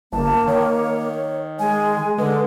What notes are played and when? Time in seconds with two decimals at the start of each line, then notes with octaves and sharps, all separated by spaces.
0.12 G1 A#3 A5
0.47 D#3 C#5
1.59 G#3 G#5
2.18 D3 G#3 B4